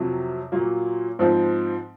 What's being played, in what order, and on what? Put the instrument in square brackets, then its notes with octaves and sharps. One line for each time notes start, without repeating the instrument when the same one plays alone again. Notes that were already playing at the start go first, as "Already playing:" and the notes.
Already playing: [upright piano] F2 C3 F#3
A#2 F#3 A#3
G#2 F3 C4